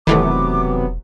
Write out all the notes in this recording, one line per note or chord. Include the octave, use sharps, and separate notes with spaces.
E1 C3 D#3 E3 F#3 A3 B3 D6